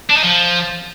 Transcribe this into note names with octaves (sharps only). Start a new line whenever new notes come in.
D4
D#4
F3